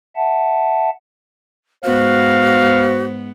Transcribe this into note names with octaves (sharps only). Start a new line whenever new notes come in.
E5 F#5 A5
G#2 B3 F#4 C5 F5